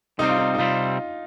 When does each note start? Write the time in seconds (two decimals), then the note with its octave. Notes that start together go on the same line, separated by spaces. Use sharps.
0.19 C3 G3 C4 D#4
0.29 F4
0.39 D#4
0.54 D#4
0.58 C3 G3 C4 F4